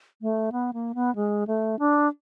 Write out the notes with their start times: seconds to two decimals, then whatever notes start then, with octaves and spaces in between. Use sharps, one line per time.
0.21 A3
0.52 B3
0.73 A#3
0.95 B3
1.15 G#3
1.47 A3
1.79 D4